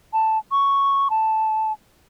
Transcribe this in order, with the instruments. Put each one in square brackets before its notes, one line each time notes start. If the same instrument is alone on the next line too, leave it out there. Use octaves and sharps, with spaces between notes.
[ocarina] A5
C#6
A5